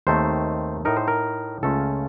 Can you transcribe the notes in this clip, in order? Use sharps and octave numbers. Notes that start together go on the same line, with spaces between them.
D#2 D#3 A3 C4 C5
A2 A3 D#4 A#4
C5
A#4
C#2 C#3 A3 C#4 F4 A4